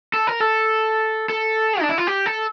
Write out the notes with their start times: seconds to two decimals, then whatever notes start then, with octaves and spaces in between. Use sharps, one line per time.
0.14 A4
0.27 A#4
0.41 A4
1.30 A4
1.81 D4
1.89 E4
1.98 F4
2.07 G4
2.26 A4